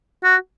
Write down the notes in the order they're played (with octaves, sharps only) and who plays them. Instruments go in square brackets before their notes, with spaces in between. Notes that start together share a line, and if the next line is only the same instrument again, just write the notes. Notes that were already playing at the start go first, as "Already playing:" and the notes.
[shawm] F#4